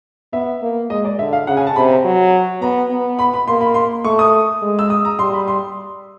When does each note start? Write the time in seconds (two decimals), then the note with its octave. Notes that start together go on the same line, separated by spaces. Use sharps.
0.33 B3 E5
0.62 A#3
0.90 G#3 D#5
1.05 D5
1.19 D3 E5
1.33 F5
1.47 C#3 F#5
1.57 G#5
1.67 A5
1.76 C3 B5
1.90 A#5
2.05 F#3
2.62 B3 A#5
2.90 B3
3.19 B5
3.34 B5
3.48 A#3 C6
3.61 B5
3.74 C6
4.04 A3 C#6
4.19 D#6
4.62 G#3
4.79 E6
4.90 D#6
5.05 A#5
5.19 G3 C6
5.33 B5
5.48 C6